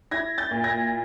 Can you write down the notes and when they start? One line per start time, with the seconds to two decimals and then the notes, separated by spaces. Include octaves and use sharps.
0.11 E4 G#6 A#6
0.38 G6 A6
0.51 A#2
0.64 G#6 A#6